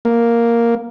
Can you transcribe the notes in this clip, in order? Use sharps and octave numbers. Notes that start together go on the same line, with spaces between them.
A#3